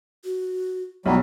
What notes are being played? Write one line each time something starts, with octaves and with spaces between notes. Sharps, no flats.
F#4
B1 F#3 G3 F4